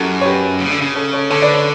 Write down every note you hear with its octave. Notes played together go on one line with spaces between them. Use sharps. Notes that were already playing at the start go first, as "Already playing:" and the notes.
Already playing: F#2 E4 F#4 G4 A4
C#5
G4 B4
C#3
D3
C#3
A4 C#5
A4 C#5
D3 A4 C#5
B4 D5
A4 C#5